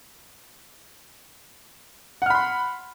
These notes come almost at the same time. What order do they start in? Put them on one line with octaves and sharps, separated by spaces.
F#5 F6 B5 C6